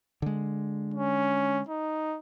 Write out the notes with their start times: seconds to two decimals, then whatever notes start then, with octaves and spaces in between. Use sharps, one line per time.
0.22 D3 G#3
0.94 C#4
1.68 D#4